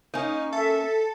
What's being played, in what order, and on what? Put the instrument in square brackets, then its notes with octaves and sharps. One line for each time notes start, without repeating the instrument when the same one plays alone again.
[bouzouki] A#3 C#4 [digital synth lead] D#4
[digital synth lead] A4 [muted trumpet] E5